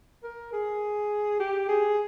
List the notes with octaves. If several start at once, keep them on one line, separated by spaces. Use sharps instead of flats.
A#4
G#4
G4
G#4